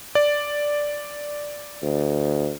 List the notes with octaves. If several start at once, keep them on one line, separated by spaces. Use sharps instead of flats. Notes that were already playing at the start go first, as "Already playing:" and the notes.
D5
D2